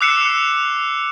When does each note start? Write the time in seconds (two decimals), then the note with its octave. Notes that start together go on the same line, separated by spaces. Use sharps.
0.01 D6 E6 F#6 C7 C#7 E7